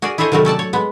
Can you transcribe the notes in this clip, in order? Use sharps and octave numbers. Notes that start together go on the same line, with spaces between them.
F#4 G#4 A#4 D5
E4 G#4 A4 C5 C#5 D#5
C3 D#3 F#3 G3 A3 A#4
C#4 A4 D5 A5
C#5
G#3 B3